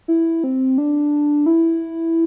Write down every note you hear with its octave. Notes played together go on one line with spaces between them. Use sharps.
E4
C4
D4
E4